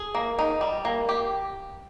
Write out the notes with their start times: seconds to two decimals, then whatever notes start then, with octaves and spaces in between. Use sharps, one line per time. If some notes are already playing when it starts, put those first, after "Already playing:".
Already playing: G#4
0.15 A#3
0.39 D#4
0.61 G3
0.85 A#3
1.09 G4